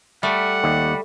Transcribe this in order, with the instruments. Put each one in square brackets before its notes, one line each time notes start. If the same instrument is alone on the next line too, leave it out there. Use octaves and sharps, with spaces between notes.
[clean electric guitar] G3 [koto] A3 [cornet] F#5
[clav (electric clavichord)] D#2